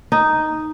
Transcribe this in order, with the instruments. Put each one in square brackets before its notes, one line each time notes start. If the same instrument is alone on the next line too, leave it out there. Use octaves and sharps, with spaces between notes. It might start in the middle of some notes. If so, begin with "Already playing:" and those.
[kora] D#4